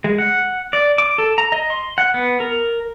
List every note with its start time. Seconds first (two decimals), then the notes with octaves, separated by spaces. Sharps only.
0.04 G#3
0.18 F#5
0.73 D5
0.98 D6
1.18 A4
1.38 A#5
1.52 D#5
1.70 C6
1.98 F#5
2.14 B3
2.40 A#4